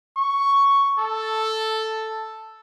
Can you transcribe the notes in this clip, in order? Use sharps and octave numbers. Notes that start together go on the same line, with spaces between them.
C#6
A4